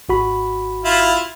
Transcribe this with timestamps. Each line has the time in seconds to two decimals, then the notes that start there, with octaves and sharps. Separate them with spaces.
0.09 G#1 F#4 B5
0.85 E4 F4